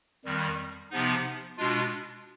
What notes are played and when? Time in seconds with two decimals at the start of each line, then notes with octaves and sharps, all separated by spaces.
0.25 F2 D#3 G3
0.91 C3 F3 B3 D#4
1.57 B2 G#3 D4 F4